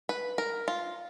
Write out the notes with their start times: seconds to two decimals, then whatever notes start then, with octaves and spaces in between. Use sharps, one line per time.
0.09 B4
0.38 A#4
0.68 F4